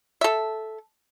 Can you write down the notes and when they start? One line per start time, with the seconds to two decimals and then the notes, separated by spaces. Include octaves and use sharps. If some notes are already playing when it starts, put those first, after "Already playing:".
0.21 A4 E5